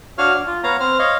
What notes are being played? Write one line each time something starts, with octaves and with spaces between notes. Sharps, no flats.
D4 F#4 C#5 F5 F6
D4
F4
B3 C#5 F5 A#5
C4 C5 F6
C#5 D#5 F5